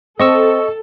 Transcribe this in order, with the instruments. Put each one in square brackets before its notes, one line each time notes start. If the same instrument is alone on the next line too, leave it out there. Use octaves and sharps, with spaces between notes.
[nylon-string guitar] C4 [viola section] A4 [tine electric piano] D#5 C#6 E6